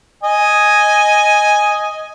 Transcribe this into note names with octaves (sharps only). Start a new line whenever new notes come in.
D#5 G#5